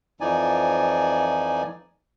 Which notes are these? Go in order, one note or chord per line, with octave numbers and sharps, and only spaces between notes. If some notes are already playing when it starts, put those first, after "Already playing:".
F2 E3 F3 D#4 D5 G#5